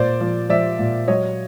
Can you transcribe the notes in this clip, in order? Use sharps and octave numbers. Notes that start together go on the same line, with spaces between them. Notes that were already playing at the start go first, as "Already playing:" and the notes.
Already playing: A#2 C5 D5
F3
F3 D5 E5
A#2
F#3 C#5 D#5